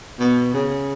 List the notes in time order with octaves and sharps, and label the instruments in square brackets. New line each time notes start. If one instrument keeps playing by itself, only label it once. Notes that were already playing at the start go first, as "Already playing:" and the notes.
[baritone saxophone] B2
C#3